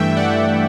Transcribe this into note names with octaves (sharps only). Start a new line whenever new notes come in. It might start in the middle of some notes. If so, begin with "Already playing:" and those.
Already playing: G2 E3 A3 E5 G5
D5 F#5